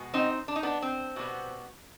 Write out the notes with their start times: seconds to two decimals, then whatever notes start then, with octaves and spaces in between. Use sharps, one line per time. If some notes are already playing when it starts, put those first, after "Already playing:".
Already playing: B2 G#3 B3
0.14 C4 D#4
0.48 D4
0.56 D#4
0.63 B3 D4
0.82 C4
1.16 B2 G3 B3